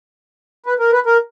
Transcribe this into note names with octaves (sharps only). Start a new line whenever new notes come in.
B4
A#4
B4
A#4